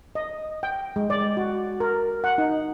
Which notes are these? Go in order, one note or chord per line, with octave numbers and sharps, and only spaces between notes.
D#5
G5
G#3
D5
F#4
A#4
F#5
D#4